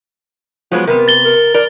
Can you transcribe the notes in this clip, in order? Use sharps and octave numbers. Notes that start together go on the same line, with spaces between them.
F3 F#3 G#3 B3
C3 B3 A#4
A6 G7
A#4
A#4 D5